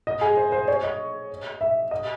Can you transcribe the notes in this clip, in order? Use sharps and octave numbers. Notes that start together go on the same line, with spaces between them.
D#5
G#4
C5
C5
C#5
D#5
E5
D#5